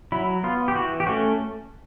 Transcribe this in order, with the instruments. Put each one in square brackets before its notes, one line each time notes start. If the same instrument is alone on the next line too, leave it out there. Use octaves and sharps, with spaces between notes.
[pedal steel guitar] F#3 E4
B3 F4
G4
E3 F#4
G4
A3 C#4 F#4